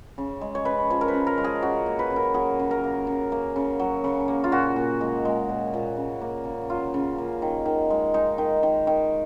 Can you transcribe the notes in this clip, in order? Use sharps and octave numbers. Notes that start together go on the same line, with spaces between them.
C#3
G#3
C#5
C#3 B4
F3 C#5
A#4
B4
C#3
A#4
G#3
G#4
C#3 F#4
A#3
B4
C#3
A#4
F#3 G#4
C#3
A#4
A#3
C#3
A#3
C#3
F#3
C#3
A#3
F4
A#2 F#4
A#2
G#3
G#3
A#2
A#2
C#3
A#3
C#3
F#3 F4
C#3
A#3
D#3
D#3
G#3
G#3 D#4
D#3
D#3
D#3